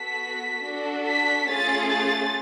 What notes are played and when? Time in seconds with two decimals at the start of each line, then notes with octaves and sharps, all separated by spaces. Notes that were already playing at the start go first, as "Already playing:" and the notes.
Already playing: B3 F#4 A4 B6
0.65 D4 F#4 A4
1.07 B6
1.49 A3 C#4 F4 G#4 A6
1.92 A6